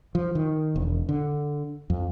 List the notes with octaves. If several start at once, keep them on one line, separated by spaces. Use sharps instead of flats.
F3
D#3
E1
D3
F2